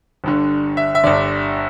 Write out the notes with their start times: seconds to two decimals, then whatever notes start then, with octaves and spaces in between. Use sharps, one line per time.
0.24 G1 G2 D3
0.77 E5
0.95 E5
1.04 G1 G2 D3 D5